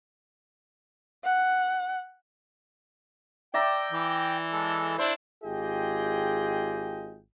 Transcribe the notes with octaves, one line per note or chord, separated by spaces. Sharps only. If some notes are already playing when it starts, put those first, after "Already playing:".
F#5
D5 E5 G5 A#5
E3
G#3 A4
D4 E4 C5
G#1 F4 G4 G#4 D#5 G5